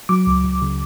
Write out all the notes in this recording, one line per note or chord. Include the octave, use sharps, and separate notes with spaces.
F#3 D6
C#2
C#2
C#3